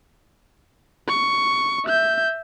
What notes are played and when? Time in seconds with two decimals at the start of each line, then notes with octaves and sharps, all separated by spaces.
1.08 C#6
1.85 E5 G6